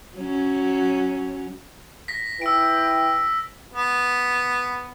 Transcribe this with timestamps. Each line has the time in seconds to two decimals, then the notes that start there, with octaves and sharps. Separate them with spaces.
0.16 F#3 C#4
2.08 A#6 B6
2.42 E4 B4 G5 E6 D7
3.73 B3